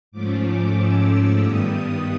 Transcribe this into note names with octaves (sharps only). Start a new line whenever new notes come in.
G#2 F3 A3 C#4 D6
D6
E6
G2 D#3 G3 B3 D#6